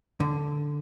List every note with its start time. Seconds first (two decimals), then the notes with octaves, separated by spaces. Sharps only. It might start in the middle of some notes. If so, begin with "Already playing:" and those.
0.20 D3